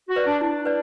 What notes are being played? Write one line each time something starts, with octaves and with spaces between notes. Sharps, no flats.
F#4
B4 D5
D4
D4 E4
B4 D5